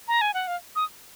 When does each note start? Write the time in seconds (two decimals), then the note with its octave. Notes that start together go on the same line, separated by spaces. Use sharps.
0.08 A#5
0.21 G#5
0.34 F#5
0.47 F5
0.76 D#6